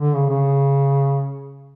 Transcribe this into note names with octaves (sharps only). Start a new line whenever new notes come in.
D3
C#3
C#3